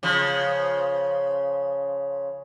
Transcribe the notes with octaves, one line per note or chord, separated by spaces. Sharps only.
C#3 F3